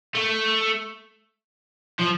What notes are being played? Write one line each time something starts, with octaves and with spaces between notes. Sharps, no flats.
A3
F3